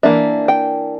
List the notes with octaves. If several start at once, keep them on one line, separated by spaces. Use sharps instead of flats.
E3 A#3 D4 E5
G5